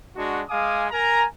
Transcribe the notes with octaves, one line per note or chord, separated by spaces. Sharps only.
G#3 D4 F#4
G#3 F5 G#5 D6 D#6
A#4 G#5 A#5